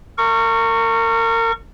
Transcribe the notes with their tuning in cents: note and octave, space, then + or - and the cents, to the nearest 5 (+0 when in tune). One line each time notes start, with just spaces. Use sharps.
A#4 -30 C#6 +0